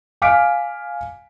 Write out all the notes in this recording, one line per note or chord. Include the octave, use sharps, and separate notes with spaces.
F5 G#5 D6 F6 B6 D7